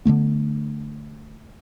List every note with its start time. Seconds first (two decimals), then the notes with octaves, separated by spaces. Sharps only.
0.05 D3 F#3 A3 B3